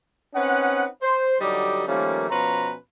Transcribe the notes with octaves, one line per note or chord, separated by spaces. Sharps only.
C4 C#4 D#4 B4 F#5
C5
D3 F#3 G3 D#4 G4 D5
D#3 F3 G3 A3 A#3 C#4
B2 F3 C#4 B4 A#5 C6